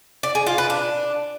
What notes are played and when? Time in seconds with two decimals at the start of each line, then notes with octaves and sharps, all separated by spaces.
0.23 D5
0.35 G#4
0.47 F4
0.58 B4
0.70 D4